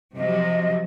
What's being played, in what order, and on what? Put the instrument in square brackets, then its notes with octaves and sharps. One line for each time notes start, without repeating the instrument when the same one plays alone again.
[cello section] C3 F3 F#3 [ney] D#5